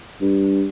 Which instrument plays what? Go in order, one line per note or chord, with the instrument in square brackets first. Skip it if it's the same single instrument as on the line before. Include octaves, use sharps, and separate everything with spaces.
[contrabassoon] G2